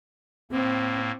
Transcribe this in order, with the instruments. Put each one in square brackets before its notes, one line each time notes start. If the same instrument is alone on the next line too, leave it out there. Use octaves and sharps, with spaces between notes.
[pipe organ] A2 A#3 [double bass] C4